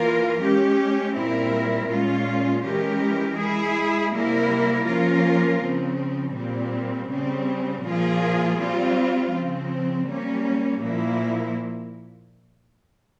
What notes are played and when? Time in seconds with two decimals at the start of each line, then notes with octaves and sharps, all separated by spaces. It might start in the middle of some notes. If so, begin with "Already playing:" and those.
Already playing: E3 A#3 F4 A#4
0.41 G#3 C#4 G4
1.15 A#2 G3 C4 E4 A#4
1.89 A#2 G#3 C#4 F4
2.64 E3 G#3 C#4 G4 A#4
3.38 G#3 E4 G#4
4.12 C3 G3 A#3 E4 A#4
4.86 F3 A#3 C#4 F4 A#4
5.61 C#3 F3 C4
6.35 A#2 G3 C4
7.10 C#3 G3 C4
7.83 A#2 F3 A#3 F4 G#4
8.58 G3 C4 F4
9.32 C#3 F3 C4
10.07 G3 A#3 C#4
10.81 A#2 F3 A#3 E4